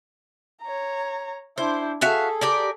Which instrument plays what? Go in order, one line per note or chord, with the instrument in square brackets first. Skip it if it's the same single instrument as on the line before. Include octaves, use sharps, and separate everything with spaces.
[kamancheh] C#5 A#5
[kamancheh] D4 E4 [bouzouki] C5
[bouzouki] F#4 E5 F5 [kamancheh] G#4 A4
[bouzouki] G4 A#4 D5